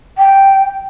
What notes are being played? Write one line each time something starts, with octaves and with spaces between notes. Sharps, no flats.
G5